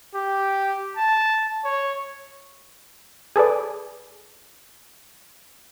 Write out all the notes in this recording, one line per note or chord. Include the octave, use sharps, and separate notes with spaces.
G4
A5
C#5
G#4 A4 B4 D5